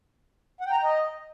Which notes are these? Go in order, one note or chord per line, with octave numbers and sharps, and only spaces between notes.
F#5
G5
A#5
G5
D#5